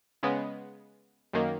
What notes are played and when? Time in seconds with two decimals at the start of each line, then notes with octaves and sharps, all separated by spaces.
0.23 C#3 G#3 B3
1.33 F#2 D#3 A#3